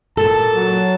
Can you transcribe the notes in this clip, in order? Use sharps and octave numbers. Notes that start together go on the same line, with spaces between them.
A#2 A4 A5
F#3